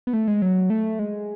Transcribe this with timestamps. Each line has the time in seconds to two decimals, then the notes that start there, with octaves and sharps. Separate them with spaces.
0.07 B3
0.13 A3
0.27 G#3
0.42 F#3
0.70 A3
0.99 G#3